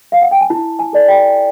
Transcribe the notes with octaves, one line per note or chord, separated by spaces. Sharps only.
F5
F#5
G5
G#5
E4 A5
G#5
A4 D5
G5